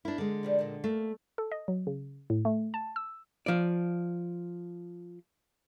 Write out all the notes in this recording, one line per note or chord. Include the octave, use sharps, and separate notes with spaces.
D4 E4 A#4
D3 G#3
F3 G3 D4
A#2 D#3
A3 A#3
A4
D#5
F#3
C#3
A2
A3
A5
E6
F3 D5